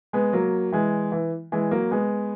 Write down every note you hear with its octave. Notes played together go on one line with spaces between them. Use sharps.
G#3 B3
F#3 A#3
E3 G#3
E3
E3 G#3
F#3 A#3
G#3 B3